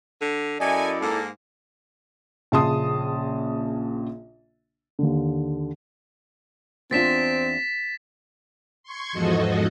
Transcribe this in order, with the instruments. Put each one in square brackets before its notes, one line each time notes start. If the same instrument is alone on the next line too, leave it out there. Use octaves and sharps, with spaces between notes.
[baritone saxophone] D3
[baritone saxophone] F#2 [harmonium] E4 D5 [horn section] A4 G#5 [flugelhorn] D#5
[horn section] G#2 A#3 [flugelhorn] A4
[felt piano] A#1 C#3 A5 C6 D#6
[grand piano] D#2 D3
[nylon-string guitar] E2 D4 F4 [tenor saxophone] C4 [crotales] A6 B6 E7
[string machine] C6 C#6 G#6
E2 G#2 F3 F#4 A4 D#5